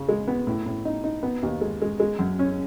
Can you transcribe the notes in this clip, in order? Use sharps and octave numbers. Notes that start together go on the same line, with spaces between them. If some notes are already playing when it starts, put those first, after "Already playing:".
Already playing: C#3
G#3
B3
A2
A2
D#4
D#4
B3
D#2
G#3
G#3
G#3
F#2
C#4